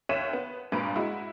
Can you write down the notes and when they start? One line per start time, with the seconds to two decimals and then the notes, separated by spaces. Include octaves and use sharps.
0.09 D#2 C#5 E5 B6 D#7 E7
0.33 B3
0.72 G#1 G2 A#2 B4 A#5 D7
0.96 G#3 E4 F#4